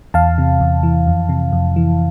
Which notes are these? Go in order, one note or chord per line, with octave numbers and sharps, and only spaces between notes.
E2 F5 A5
C3
E2
E3
F2
C3
F2
E3